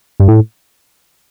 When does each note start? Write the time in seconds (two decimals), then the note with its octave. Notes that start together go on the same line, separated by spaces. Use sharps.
0.20 G2
0.28 A2